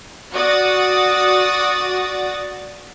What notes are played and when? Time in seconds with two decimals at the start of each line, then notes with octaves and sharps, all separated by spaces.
0.34 F#4 D5 D#6 A6